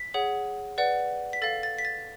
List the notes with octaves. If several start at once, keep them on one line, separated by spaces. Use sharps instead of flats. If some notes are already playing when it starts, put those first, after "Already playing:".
Already playing: B6
G#4 C#5 F#5
B4 D5 F#5
B6
A4 F5 A6
A6
B6
A6